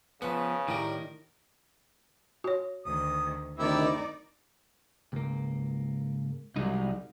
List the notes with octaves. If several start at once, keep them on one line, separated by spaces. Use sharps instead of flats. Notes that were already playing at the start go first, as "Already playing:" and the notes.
C#3 F3 B3 B4
A2 D#3 G3 A#4
F#4 C#5
D2 D#3 D#6
D2 C3 D#3 D#4 E4 G4 D5 E6
C#2 G#2 A#3
C2 F#3 G#3 D#4